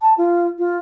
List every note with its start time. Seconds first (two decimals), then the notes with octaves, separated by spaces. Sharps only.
0.02 A5
0.18 F4
0.59 F4